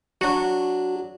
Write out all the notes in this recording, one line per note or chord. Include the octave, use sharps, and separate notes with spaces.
F#3 D4 F#4